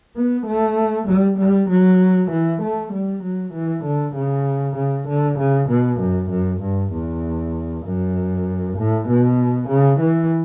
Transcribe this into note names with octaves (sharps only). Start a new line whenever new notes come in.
B3
A3
G3
G3
F#3
E3
A3
G3
F#3
E3
D3
C#3
C#3
D3
C#3
B2
F#2
F#2
G2
E2
F#2
A2
B2
C#3
E3